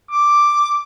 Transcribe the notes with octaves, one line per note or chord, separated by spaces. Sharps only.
D6